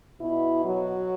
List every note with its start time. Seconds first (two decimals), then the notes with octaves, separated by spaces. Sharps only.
0.21 B2 E4
0.64 F#3